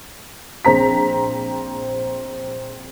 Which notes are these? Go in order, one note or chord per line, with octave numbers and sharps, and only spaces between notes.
A#1 C4 A#5 B6